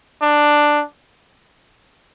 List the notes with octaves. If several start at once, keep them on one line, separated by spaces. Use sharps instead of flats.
D4